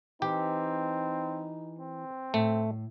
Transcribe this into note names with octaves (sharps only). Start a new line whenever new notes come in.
E3 C4 D#4 G4
C4
A2 A3